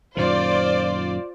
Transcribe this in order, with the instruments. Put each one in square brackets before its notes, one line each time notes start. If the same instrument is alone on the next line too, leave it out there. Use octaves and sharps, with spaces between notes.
[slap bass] F#2 A#2 D#3 [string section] F4 C5 D5